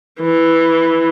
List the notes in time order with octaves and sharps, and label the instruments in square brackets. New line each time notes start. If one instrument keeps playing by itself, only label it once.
[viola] E3